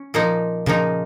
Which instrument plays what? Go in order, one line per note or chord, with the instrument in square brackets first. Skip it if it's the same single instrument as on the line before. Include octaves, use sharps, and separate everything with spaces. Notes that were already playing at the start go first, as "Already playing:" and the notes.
Already playing: [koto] C#4
A#2 F3 A#3 D#4
[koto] A#2 F3 A#3 D#4 [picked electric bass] C#3